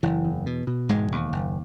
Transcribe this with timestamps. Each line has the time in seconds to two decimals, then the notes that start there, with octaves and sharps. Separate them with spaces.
0.03 F#1 E3
0.25 E2
0.46 B2
0.67 B2
0.89 E1 G#2 G#3
1.12 D#2
1.32 F#1